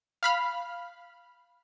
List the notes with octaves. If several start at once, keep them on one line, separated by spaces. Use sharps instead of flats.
F5 B5 F6